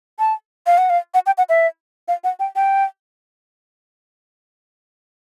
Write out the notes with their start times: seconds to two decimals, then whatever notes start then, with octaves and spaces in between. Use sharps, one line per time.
0.19 A5
0.67 F5
0.78 F#5
0.90 F5
1.14 F#5
1.26 G5
1.38 F#5
1.49 E5
2.08 F5
2.24 F#5
2.40 G5
2.56 G5